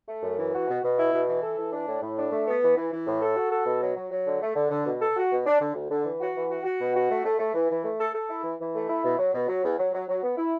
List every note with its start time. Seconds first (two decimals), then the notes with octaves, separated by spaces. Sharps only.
0.08 A3
0.23 F#2
0.38 E3
0.54 F#4
0.68 B2
0.84 B2
0.98 E4
1.13 B2
1.28 E3
1.43 A4
1.58 E3
1.73 D4
1.87 A2
2.02 A2
2.18 D4
2.32 A3
2.48 B3
2.62 E3
2.77 E3
2.92 E3
3.06 A2
3.22 A4
3.36 F#4
3.52 A4
3.66 B2
3.82 F#3
3.96 F#3
4.12 F#3
4.27 D3
4.42 A3
4.56 D3
4.70 D3
4.86 B2
5.01 A4
5.16 F#4
5.31 B2
5.46 D4
5.60 D3
5.75 D2
5.91 D3
6.05 E3
6.21 F#4
6.35 E3
6.50 F#4
6.65 F#4
6.80 B2
6.95 F#4
7.10 A3
7.25 A3
7.39 A3
7.54 E3
7.70 E3
7.84 A3
8.00 A4
8.15 A4
8.30 E4
8.44 E3
8.60 E3
8.75 A3
8.89 E4
9.05 B2
9.19 F#3
9.34 B2
9.48 F#3
9.64 E2
9.79 F#3
9.94 F#3
10.08 F#3
10.23 B3
10.38 E4